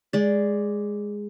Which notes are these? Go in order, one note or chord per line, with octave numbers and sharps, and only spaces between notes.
G#3 D5